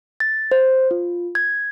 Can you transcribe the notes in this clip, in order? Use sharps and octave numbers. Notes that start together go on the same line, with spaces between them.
A6
C5
F4
G#6